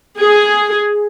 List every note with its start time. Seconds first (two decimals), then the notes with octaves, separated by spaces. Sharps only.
0.19 G#4